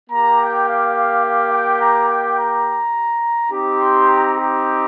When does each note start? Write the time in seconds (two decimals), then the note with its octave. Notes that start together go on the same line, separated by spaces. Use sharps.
0.10 A#3 G4 A#5
0.39 G5
0.66 F5
0.95 F5
1.24 F5
1.52 G5
1.80 A#5
2.08 G5
2.36 A#5
3.50 C4 D#4 G4
3.78 C6
4.07 A#5
4.35 G4